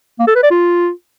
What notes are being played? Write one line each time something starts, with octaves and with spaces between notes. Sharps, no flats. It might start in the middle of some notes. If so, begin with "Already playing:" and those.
A#3
A4
B4
D5
F4